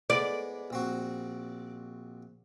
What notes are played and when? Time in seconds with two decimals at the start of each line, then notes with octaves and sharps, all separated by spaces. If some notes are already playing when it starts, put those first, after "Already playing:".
0.10 G#3 B3 D5 B5
0.70 A#1 C4 F#4